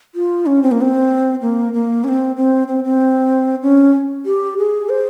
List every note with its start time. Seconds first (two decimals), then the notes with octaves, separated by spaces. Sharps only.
0.15 F4
0.46 C#4
0.63 C4
0.71 A#3
0.81 C4
1.41 A#3
1.73 A#3
2.04 C#4
2.08 C4
2.36 C4
2.68 C4
2.84 C4
3.62 C#4
4.26 G4
4.58 G#4
4.89 C5